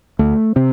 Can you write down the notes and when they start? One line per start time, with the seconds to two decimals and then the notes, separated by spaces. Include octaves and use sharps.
0.19 D2 A3
0.56 C3 C4